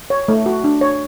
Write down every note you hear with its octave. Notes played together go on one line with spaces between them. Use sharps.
C#5
A3
F#4
D4
C#5